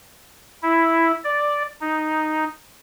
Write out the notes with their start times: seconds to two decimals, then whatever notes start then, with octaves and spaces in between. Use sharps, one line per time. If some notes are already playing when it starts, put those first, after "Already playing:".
0.62 E4
1.24 D5
1.81 D#4